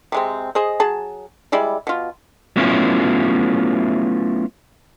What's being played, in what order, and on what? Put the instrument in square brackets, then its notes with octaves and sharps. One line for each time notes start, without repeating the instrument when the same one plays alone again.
[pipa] C3 G#3 C4
G#4 C5 D#5
F#3 G#4 A5
G3 G#3 E4 D5
B2 F4
[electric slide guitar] F#3 A3 B3 C#4 E4 F4